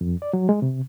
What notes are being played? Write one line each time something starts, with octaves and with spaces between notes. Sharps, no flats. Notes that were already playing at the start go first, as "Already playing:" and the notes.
F2
D5
F#3
G#3
C3